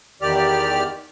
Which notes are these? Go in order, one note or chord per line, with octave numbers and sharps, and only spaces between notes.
E2 D#3 G4 D5 F6